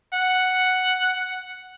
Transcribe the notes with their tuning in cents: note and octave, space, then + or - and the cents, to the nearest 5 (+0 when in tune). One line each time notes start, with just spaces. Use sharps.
F#5 +0